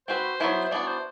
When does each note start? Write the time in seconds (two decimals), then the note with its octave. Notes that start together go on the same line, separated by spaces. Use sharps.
0.08 C4 F#4 B4 C5
0.40 F#3 B3 E4 B4
0.65 C5
0.71 E3 B3 D4 F#4 D5
0.87 C5